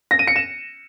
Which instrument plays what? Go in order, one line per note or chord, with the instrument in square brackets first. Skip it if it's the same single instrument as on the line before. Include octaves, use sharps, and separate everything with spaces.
[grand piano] A#6
D#7
C#7
E7